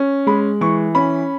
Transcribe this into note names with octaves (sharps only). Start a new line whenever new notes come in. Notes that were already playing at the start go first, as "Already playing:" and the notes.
Already playing: C#4
G#3 B5
E3 C#6
C#4 B5